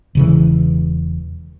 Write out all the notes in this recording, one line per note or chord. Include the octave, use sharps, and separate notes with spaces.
E1 C#3 E3